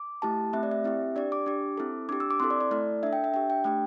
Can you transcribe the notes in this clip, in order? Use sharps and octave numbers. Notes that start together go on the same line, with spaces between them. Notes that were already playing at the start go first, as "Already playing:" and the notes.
Already playing: D6
A3 E4 G4 A5
A3 C4 G4 E5
D5
E5
C4 E4 G4
D4 G4 D5
D6
D4 G4
C4 E4 A4
D4 G4 D6
E6
D6
C4 E4 A4 C6
D5
D5
A3 E4 A4 D5
D4 A4 E5
G5
E5
D4 G4 G5
G5
A3 D4 G4 G5